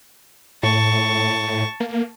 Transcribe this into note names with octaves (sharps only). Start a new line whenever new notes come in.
A2 A5 C#6
A#3